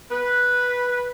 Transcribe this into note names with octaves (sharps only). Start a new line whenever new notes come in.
B4